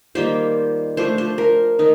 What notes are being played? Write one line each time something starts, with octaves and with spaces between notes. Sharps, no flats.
D#3 G3 A#3 F4 C5
F3 A3 D4 C5
C5
A#4
D#3 A3 D#4